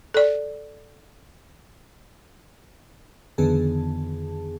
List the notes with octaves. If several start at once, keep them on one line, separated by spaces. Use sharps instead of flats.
A4 D5
F2 D3 D#3 B3 G#4 A5